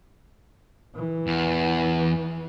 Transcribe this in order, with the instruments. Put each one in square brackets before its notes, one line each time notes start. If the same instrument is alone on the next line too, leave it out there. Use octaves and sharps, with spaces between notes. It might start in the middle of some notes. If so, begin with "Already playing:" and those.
[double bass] E3
[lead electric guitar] E2